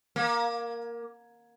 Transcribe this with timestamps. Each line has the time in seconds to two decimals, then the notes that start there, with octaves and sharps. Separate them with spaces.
0.16 A#3